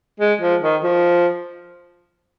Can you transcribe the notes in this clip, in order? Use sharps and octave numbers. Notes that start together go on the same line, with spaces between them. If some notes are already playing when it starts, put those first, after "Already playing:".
G#3
F3
D#3
F3